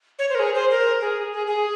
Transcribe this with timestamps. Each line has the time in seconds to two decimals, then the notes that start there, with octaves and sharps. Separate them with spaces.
0.19 C#5
0.30 C5
0.35 A#4
0.40 G#4
0.55 C5
0.71 A#4
1.01 G#4
1.32 G#4
1.47 G#4